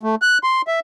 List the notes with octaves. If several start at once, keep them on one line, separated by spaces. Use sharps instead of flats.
A3
F#6
C6
E5